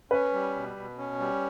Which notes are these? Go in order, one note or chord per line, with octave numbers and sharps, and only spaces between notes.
C#4 B4
G3
B2
B2
C#4
G3